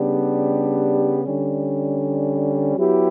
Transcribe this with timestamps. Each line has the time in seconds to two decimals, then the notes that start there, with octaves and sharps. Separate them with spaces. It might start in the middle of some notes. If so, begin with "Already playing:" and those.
Already playing: C#3 G3 B3 D4 G4
1.25 D3 G3 C#4
2.77 F#3 B3 E4 G4